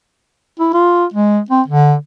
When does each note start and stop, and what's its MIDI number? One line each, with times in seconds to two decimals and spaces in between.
0.60 0.72 64
0.74 1.05 65
1.14 1.40 56
1.51 1.62 60
1.68 1.94 50